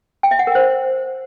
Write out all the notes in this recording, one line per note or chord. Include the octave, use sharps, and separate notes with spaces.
G5
E5
F#5
A#4
C5